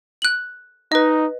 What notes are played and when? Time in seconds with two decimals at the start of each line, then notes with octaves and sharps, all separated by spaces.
0.22 F#6 F#7
0.92 D#4 B4 D#5